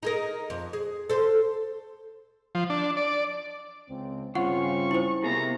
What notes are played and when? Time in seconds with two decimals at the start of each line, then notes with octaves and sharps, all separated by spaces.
0.03 D#4 G#4 A#4
0.50 F2
0.73 G#4
1.10 A4 C5
2.55 F3
2.70 D4
2.97 D5
3.90 C#2 C4
4.35 G2 C#3 C4 C#4 F4 F#5 C#6
4.91 E4 C5
5.24 C3 A#3 B3 G#4 A#5